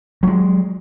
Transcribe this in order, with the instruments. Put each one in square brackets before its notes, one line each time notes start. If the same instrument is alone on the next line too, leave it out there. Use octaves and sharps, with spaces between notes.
[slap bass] F#3 G#3